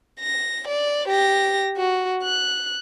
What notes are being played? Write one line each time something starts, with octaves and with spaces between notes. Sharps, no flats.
A#6
D5
G4 A#6
F#4
F#6